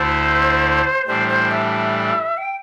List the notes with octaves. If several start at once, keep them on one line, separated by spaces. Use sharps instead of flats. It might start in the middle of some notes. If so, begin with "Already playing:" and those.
Already playing: D2 D3 A3 E4 C5
A2 E3 G3 D4 C5
C5
E5
G5